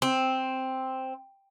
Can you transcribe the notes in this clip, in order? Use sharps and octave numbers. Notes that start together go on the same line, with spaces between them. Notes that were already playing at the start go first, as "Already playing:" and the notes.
C4